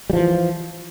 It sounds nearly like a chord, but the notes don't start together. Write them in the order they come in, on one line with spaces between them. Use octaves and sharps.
G3 F3 E3